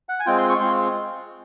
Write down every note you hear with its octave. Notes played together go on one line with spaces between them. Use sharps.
F#5
G#5
G#3 C4 F4 G5
C6
C#6
G#3 C4 F4 C6